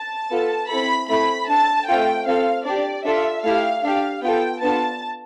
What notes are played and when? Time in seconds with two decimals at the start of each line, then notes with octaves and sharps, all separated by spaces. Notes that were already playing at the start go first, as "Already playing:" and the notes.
Already playing: A5
0.30 B3 F4 A4
0.69 C4 E4 A4 B5
1.09 A3 C4 E4 B5
1.48 D4 A4 A5
1.87 A3 C4 F4 A4 G5
2.26 C4 F4 A4 F5
2.65 D4 G4 D5
3.04 D4 F4 A4 E5
3.43 A3 E4 G4 F5
3.83 D4 G4 F5
4.22 B3 F4 A4 G5
4.61 B3 D4 F4 A4 A5